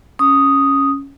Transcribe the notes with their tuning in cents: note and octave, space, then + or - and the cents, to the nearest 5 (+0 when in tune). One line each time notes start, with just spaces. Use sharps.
C#4 +0 D#6 +0